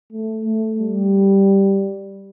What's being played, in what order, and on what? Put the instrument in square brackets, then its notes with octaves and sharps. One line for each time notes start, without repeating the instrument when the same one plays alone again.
[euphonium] A3
A3
G3